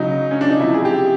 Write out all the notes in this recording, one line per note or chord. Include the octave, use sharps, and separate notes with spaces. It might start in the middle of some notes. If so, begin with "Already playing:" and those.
Already playing: C#3 F#3 D#4
C#4
D4
D#4
C3 F3 E4
G#4
G4